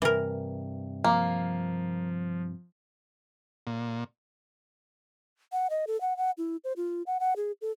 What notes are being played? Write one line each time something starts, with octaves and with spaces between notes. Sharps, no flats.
G2 C3 E3 A#4
F3 A#3
A#2
F#5
D#5
A4
F#5
F#5
E4
C5
F4
F#5
F#5
G#4
A4